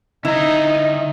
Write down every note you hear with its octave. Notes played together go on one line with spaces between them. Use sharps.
D3 D#4 E4 D#5 A#5